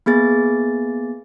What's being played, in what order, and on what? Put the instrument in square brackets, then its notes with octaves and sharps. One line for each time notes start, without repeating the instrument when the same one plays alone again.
[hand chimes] A#3 B3 G#4 A6